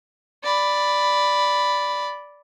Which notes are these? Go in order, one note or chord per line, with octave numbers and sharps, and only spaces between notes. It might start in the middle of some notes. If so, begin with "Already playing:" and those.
D5 B5